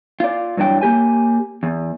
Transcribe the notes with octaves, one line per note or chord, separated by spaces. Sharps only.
F4 D5
G2 E3 F#3 D4 G5
A#3 G4 G#5
E2